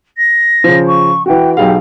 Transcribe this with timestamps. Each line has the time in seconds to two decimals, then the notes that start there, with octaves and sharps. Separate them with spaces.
0.17 A#6
0.64 C#3 F3
0.87 C#6
1.26 E3 F#4 G5
1.57 B1 G4 G#4 F5